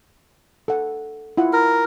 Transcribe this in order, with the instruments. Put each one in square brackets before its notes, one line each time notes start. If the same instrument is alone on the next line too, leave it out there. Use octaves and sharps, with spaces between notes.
[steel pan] A4 F#5
E4 F4 F#5
[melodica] A#4